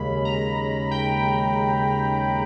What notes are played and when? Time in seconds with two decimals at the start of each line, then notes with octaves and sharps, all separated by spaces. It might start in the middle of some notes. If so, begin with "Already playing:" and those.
Already playing: D#2 C#3 G#3 B5
0.25 A#5
0.91 G5